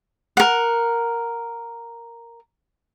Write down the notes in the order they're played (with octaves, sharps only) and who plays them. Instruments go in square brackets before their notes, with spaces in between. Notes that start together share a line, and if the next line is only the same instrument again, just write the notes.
[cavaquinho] A#4 F#5